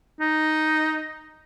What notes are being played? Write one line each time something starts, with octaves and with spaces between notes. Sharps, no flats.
D#4